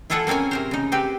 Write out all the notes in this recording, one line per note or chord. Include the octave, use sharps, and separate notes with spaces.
E4 F4 G#4 A4 F#5 G5
A#3 C4 C#4 A#4 G#5
C3 A#4 C5
C#3 D#4
C4 G4 B4